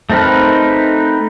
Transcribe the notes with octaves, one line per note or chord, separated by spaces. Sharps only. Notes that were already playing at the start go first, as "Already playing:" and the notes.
A3 C4 D#4 A#4 B4